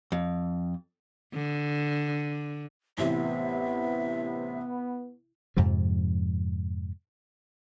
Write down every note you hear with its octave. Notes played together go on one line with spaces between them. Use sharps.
F2
D3
A1 C3 E3 B3 E5
F2 G#2 C3 F3